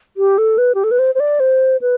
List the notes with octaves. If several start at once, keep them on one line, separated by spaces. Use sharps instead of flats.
G4
A4
B4
G4
A4
B4
C5
C5
D5
C5
B4